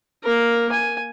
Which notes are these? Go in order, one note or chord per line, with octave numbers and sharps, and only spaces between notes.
A#3 A#4
G#5